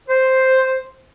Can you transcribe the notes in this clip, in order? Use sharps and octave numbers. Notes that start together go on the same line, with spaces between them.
C5